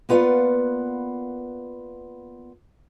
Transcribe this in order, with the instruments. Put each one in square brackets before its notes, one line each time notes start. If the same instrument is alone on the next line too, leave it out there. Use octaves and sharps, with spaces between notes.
[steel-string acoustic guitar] A#3 B3 F4 B4 D5 F#5